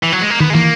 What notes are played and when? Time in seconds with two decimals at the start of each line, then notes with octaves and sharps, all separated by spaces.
0.03 E3
0.12 F#3
0.21 G#3
0.30 A#3
0.40 D#3 B3
0.50 G#3
0.55 E3 A#3